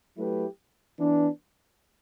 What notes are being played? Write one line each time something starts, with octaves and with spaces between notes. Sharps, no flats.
F#3 A3 E4 G4 B4
E3 B3 D4